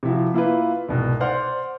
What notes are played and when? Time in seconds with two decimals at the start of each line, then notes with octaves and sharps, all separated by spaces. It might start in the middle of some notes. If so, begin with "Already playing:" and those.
0.03 C3 F3 E4 F#4
0.34 A#3 E4 F4 B4
0.89 C2 G#2 B2
1.20 C5 D5 F#5 C6 F6